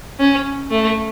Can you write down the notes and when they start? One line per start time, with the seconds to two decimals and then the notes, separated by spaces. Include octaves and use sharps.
0.20 C#4
0.70 A3